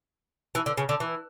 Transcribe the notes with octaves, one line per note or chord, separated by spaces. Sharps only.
E3
D3
C#3
D3
E3